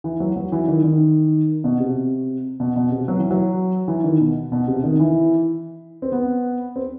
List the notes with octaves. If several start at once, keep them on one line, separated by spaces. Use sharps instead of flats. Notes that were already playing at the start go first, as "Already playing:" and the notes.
E3
F#3
F#3
E3
D#3
D#3
B2
C3
B2
B2
C3
F#3
E3
F#3
E3
D#3
B2
B2
C3
D#3
E3
C4
B3
C4